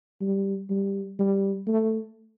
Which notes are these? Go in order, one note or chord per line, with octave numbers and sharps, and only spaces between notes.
G3
G3
G3
A3